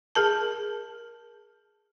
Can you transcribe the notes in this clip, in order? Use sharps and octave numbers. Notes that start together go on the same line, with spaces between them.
G#4 A#4 A5